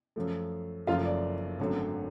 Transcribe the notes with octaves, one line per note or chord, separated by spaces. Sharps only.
F#2 F3 A3
F#1 F#2 F3 A3 F4 F5
D5
G#1 F#2 D3 F#3 A3